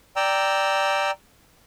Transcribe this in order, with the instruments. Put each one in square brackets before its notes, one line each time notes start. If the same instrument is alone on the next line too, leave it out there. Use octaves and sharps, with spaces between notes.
[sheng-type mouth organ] D5 G5 A#5 E6